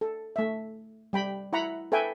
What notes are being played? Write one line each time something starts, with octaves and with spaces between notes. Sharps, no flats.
A4
A3 E5
G3 G5 B5
E4 F#5 A#5 B5
A4 B4 E5 G5 G#5